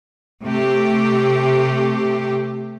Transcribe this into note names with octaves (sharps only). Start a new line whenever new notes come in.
C3 A3 G4